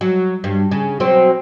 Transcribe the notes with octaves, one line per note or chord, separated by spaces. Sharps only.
F#3
G2
C#3
B2 F#3 C4